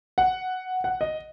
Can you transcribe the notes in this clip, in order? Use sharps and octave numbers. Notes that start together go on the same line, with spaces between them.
F#5
F#5
D#5